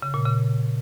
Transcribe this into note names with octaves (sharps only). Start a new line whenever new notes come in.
C#3
A#2
C#3